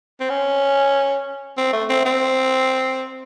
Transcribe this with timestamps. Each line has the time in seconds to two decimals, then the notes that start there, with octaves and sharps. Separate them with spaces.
0.21 C4
0.30 C#4
1.58 C4
1.73 A3
1.90 C4
2.05 C4